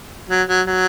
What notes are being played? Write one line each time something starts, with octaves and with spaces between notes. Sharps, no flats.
F#3
F#3
F#3